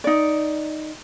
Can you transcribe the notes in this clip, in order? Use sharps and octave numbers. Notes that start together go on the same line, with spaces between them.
D#4 D5